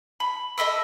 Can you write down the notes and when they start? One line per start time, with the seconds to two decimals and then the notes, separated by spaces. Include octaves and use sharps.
0.20 B5
0.58 A4 D#5 E5 B5